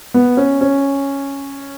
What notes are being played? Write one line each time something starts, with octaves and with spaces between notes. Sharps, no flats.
B3
C#4
C#4